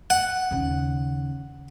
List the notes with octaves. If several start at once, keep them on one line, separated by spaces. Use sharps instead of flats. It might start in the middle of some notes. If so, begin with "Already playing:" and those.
F#5
D#2 C#3